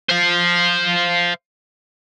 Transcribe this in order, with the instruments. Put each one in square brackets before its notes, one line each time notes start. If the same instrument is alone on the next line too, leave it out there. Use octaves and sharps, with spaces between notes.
[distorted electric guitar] C5 F5